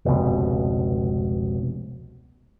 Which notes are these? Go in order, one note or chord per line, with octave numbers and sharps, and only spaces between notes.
F1 C#2 B2